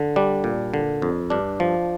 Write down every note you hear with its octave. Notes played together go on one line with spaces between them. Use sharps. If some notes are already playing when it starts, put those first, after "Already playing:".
Already playing: D3
G3 D4
A#2
D3
F2
G2 D4
F3